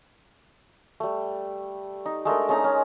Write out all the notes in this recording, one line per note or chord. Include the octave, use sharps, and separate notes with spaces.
G3 A3
D#4
G#3 A3 D4 A#4
G#3 C#4 D#4 A#5
C#4